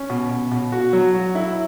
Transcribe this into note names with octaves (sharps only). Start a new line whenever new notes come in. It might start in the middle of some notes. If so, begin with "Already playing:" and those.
Already playing: C#4
B2
B2
B2
F#4
F#3
F#4
E4